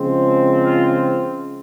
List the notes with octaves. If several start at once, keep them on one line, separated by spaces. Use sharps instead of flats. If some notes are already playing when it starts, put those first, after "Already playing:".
Already playing: C#3 F3 G#3 C4
F4